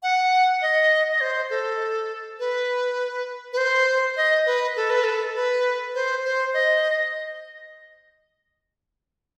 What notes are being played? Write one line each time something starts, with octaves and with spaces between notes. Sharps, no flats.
F#5
D#5
D#5
C5
A4
B4
B4
C5
D#5
B4
A4
B4
A4
B4
C5
C5
D#5